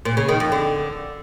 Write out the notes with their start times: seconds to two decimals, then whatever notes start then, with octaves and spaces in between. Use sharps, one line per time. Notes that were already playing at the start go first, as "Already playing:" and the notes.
0.05 A#2
0.17 C#3
0.29 D#3
0.40 F2
0.52 D3